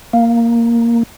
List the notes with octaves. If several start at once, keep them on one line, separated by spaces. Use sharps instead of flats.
A#3